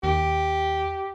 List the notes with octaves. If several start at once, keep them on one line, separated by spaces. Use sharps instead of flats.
D#2 G4